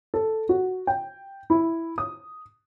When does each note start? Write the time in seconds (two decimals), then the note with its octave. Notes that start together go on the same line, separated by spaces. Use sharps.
0.14 A4
0.49 F#4
0.87 G5
1.50 E4
1.98 D#6